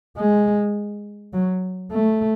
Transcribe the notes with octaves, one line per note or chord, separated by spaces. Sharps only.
G#3
F#3
A3